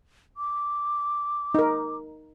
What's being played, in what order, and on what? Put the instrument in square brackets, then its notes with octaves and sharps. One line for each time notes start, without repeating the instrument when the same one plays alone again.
[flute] D6
[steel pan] D#4 A#4